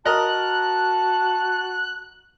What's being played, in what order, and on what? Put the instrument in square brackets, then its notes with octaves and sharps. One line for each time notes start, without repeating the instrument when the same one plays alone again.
[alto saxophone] F#4 [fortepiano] A#4 D#5 A#5 [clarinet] A5 [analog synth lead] F#6